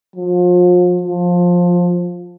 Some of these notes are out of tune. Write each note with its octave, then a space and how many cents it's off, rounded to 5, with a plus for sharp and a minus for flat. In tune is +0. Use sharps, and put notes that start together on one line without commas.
F3 +35
F3 +15